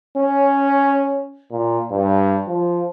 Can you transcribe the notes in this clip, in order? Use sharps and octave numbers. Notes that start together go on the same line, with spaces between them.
C#4
A#2
G2
F3